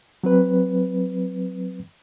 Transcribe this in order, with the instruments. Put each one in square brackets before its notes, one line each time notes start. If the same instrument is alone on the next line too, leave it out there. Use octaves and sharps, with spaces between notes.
[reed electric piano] F#3 C4 B4